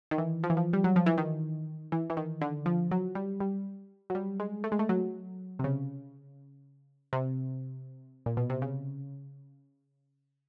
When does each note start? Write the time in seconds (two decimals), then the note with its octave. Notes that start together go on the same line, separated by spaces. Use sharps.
0.11 D#3
0.18 E3
0.43 F3
0.50 E3
0.57 F3
0.73 G3
0.84 F#3
0.96 F3
1.06 E3
1.18 D#3
1.92 E3
2.10 E3
2.17 D#3
2.41 D3
2.66 F3
2.91 F#3
3.15 G3
3.40 G3
4.10 F#3
4.15 G3
4.40 G#3
4.64 A3
4.72 G#3
4.79 A3
4.89 F#3
5.59 C3
5.64 C#3
7.13 C3
8.26 A#2
8.37 B2
8.50 C3
8.62 C#3